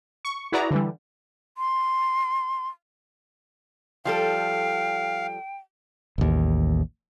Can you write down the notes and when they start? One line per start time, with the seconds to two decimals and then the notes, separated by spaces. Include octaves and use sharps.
0.25 C#6
0.52 E4 F#4 G#4 B4 D5 A#5
0.71 D3 E3 G3
1.56 C6
4.05 F3 G3 A4 F5 G5
6.18 A1 D#2